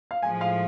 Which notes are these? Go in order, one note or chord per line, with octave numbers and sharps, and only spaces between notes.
F5
A2 F3 G#3 G#5
F5